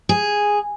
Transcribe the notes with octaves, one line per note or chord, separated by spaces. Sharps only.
G#4